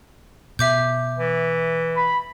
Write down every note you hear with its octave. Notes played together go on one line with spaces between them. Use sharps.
B2 E5 D6 G6
E3
B5